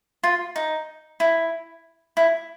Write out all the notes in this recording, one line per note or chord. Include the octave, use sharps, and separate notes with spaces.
F4
D#4
E4
E4